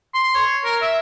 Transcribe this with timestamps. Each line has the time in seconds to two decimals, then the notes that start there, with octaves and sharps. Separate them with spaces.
0.15 C6
0.35 C#5
0.65 A#4
0.82 E5